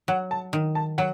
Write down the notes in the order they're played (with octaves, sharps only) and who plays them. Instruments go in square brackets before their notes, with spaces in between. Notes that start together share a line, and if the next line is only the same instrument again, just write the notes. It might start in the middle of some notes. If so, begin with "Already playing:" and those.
[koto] F#3 [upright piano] F#5
[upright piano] A5
[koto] D#3
[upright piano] A5
[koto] F#3 [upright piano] F#5